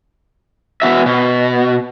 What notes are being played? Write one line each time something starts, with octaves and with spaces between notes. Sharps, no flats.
B3 F#4 E5
B2